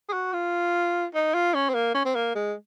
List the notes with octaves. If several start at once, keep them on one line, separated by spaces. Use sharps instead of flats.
G#4
F#4
F4
D#4
F4
C#4
C4
A#3
C#4
C4
A#3
G#3